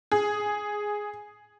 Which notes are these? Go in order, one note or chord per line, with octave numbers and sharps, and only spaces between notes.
G#4